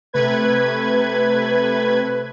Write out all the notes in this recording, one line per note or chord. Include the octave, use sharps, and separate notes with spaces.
C3 A3 B4 G#6